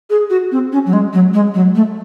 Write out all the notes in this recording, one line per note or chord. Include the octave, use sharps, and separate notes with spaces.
G#4
F#4
C4
C#4
F#3
G#3
F#3
G#3
F#3
A3